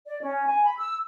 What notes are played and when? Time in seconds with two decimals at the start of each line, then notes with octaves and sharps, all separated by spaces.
0.06 D5
0.22 C#4
0.47 G#5
0.65 B5
0.78 E6